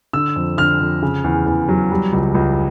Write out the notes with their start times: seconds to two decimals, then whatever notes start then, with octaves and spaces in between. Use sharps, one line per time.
0.13 D3 E6
0.36 F2
0.58 D3 F6
0.80 F2
1.02 C#3
1.24 E2
1.46 E2
1.69 F#3
1.91 G3
2.13 C#2
2.35 C#2